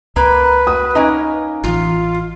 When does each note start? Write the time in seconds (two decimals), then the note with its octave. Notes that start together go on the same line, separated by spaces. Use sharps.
0.16 C#2 A#3 B4
0.67 F#4 D#6
0.95 A#3 C#4 D#4 D#5
1.64 A1 E3 F4